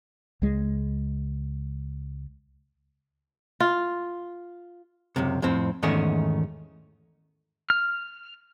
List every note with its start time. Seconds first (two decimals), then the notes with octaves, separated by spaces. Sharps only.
0.42 C#2 G#3
3.60 F4
5.16 C#2 F#2 C3
5.42 F2 A2 C4
5.83 E2 G#2 D#3 A3 C#4 D#4
7.70 F6